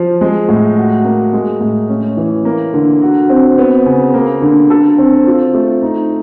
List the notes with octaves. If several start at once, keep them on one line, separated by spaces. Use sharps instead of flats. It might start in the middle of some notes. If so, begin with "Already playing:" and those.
Already playing: F3
G#3
A2
F#4
A#3
G#3
A2
C#4
E3
A#3
D3
F#4
C4
B3
C#3
A#3
D3
A4
C4
F4
A3
D#4